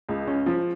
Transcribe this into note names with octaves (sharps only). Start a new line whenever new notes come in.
C#2
C#4
F3